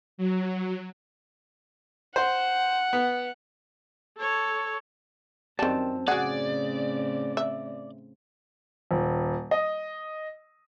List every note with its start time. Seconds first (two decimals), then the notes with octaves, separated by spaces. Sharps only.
0.18 F#3
2.16 C5 F#5
2.93 B3
4.18 A4 C#5
5.59 F#2 D#3 G3 C4 A5
6.08 A2 C#3 C4 F#4 G#4 D5 F#5
7.37 E5
8.91 D#1
9.51 D#5